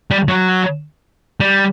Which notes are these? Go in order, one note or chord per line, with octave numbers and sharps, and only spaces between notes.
G3
F#3
G3